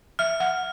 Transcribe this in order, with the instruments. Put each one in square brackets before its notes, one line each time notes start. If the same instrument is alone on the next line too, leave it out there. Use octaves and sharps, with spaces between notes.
[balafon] E5 [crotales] F6
[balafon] F#5 [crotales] F6